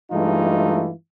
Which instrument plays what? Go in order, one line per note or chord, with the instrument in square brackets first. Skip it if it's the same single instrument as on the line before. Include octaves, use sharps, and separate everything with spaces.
[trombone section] G2 E3 G#3 A3 D#4 F4